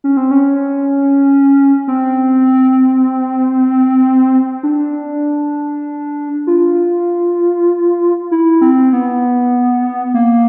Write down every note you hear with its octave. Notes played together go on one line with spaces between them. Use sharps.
C#4
C4
C#4
C4
D4
F4
E4
C4
B3
A#3